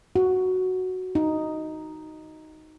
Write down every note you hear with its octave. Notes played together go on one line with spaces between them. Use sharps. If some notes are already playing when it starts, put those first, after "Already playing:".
F#4
D#4